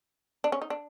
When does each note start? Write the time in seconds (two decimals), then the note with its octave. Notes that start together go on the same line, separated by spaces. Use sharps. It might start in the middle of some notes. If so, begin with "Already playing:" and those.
0.44 D4
0.52 C#4
0.62 D#4
0.70 D4